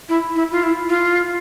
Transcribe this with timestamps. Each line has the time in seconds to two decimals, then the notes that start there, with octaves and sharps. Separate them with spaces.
0.09 E4
0.36 E4
0.52 F4
0.63 E4
0.89 F4